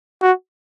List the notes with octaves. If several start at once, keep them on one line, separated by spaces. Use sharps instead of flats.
F#4